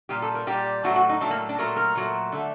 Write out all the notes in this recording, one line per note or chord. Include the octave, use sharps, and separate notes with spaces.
A#2 G3 G4
A4
A#4
A#2 G3 G4
A2 F#3 A3 F#4
F#4
D#4
A2 F#3 A3 D4
A#3
D4
A#2 F#3 A3 A#4
A#4
A#2 F#3 A3
D3 A3